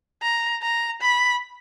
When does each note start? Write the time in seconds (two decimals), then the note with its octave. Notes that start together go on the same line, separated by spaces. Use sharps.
0.22 A#5
0.62 A#5
1.02 B5